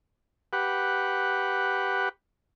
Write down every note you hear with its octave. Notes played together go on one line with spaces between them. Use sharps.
G4 B4 F#5